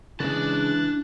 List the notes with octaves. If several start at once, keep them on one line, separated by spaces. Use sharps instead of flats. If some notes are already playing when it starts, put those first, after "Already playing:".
C#3 E3 G#3 D4 A5 F#6 A6